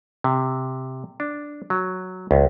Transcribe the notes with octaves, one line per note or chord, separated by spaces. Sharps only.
C3
D4
F#3
C#2